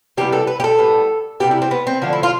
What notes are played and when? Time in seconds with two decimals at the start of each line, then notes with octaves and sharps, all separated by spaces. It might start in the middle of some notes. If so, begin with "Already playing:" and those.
0.17 C3 E3 G3 B3 G4
0.32 A4
0.47 B4
0.60 G4
0.64 A4
0.78 A2 G3 B3
1.40 C3 G3 B3 G4
1.51 E4
1.62 C4
1.71 B3
1.87 C4
2.02 D3 F3 A3 D4
2.13 E4
2.23 F4